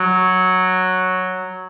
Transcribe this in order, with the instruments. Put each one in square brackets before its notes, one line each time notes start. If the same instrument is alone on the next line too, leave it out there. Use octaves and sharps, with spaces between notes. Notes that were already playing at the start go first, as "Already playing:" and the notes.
Already playing: [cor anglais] F#3